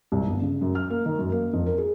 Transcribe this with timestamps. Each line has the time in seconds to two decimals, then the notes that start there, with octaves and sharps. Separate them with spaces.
0.12 C2
0.27 G1
0.42 C#3
0.61 F#2
0.75 F6
0.90 A#3
1.06 D#3
1.19 F#2
1.32 A#3
1.53 F2
1.66 A#4
1.78 G#4